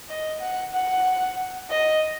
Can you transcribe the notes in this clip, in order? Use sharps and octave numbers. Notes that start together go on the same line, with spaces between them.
D#5
F#5
F#5
D#5